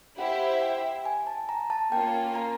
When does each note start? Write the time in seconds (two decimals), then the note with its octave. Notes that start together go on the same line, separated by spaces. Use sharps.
0.18 E4 G4 C5 E5 F#5
0.62 G5
1.06 G#5
1.27 A5
1.49 A#5
1.70 A5
1.91 A#3 C#4 F4 G5
2.35 A#5